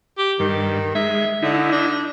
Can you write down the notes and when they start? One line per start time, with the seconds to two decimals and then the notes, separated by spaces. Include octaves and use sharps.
0.18 G4
0.39 G2 D#3
0.95 G#3 E5
1.42 D3 D#4 E4
1.71 D4